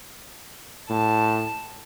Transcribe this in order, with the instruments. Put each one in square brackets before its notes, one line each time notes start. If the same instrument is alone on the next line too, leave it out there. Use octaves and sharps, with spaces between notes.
[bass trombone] A2 [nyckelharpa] A5